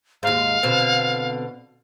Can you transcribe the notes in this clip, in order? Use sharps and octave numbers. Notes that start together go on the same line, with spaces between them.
D#2 G#2 F5
B2 D3 C4